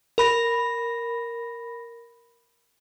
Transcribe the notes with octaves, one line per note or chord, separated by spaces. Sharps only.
A#4 B5 A#6